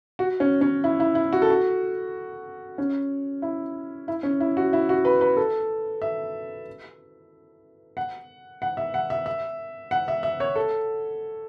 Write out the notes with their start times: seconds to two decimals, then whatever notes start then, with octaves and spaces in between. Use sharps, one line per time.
0.19 F#4
0.40 C#4
0.61 C#4
0.84 E4
1.00 E4
1.15 E4
1.33 F#4
1.42 A4
1.50 F#4
2.78 C#4
3.42 E4
4.08 E4
4.23 C#4
4.40 E4
4.57 F#4
4.73 E4
4.89 F#4
5.05 B4
5.21 B4
5.37 A4
6.02 E5
7.97 F#5
8.62 F#5
8.77 E5
8.94 F#5
9.10 E5
9.26 E5
9.91 F#5
10.08 E5
10.23 E5
10.40 C#5
10.56 A4